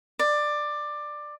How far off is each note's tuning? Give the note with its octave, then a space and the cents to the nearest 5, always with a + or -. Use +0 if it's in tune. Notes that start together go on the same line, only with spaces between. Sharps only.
D5 +15